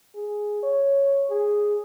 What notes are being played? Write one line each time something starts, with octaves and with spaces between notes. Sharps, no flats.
G#4
C#5
G#4